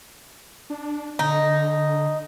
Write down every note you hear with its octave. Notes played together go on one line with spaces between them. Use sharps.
D4
D3 D#4